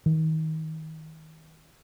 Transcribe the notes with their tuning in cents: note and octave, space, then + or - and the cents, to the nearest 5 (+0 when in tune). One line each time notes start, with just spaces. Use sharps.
D#3 +30